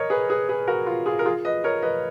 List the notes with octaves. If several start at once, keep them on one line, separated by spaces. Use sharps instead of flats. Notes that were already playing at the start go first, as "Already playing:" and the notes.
Already playing: A#4 C#5 D#5
G#4 B4
G#4 B4
G#4 B4
F#4 A#4
F4
F4 G#4
A#4
F4 G#4
B4 D#5
A#4 C#5
B4 D#5